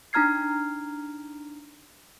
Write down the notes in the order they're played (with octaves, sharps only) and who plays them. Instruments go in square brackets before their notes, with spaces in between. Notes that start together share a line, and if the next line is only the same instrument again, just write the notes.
[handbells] D4 D#4 A#5 F6 G#6 C7